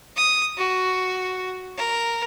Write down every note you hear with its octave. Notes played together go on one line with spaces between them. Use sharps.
D#6
F#4
A#4